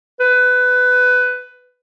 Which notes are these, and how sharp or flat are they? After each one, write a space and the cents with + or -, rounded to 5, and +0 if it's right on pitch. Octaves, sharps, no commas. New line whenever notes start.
B4 +15